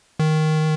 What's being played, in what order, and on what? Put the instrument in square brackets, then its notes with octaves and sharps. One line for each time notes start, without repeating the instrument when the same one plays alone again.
[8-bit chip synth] D#3